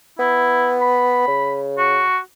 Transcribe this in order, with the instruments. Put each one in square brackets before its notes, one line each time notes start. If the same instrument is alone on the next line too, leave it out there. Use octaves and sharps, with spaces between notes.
[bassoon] B3 [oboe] E4
[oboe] B5
[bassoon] C#3
[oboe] F#4